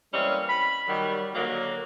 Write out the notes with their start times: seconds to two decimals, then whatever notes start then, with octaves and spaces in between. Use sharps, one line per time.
0.14 E3 G3 G#3 A#3 C4 C#4
0.49 B5
0.88 D#3 F#3 G3
1.34 D3 F#3 A#3